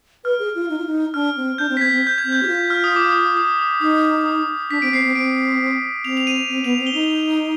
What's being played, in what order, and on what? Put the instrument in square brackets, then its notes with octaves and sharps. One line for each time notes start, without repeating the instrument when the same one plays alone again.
[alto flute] B4 [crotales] F6
[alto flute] G#4
F4
D#4
F4
D#4
[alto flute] D4 [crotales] F6
[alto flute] C4
[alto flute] D4 [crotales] G6
[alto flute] C4
[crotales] B6
[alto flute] C4 [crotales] G#6
[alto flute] C4
[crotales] G6
G#6
[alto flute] C4
[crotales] G6
[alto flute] G4
F4
[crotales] F6
D#6
D6
D#6
D#6
D#6
[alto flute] D#4 [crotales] D#6
[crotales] D#6
[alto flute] D4 [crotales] B6
[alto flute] C4 [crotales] D7
[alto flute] C4 [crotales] C7
[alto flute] C4
[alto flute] C4 [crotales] D7
[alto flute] C4 [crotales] F7
[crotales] F7
D#7
[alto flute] C4
[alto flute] B3 [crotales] F7
[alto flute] C4 [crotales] F7
[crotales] G7
[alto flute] D#4 [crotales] F7